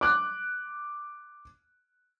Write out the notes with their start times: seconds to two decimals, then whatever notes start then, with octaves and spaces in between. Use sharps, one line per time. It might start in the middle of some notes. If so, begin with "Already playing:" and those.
0.01 D6 F#6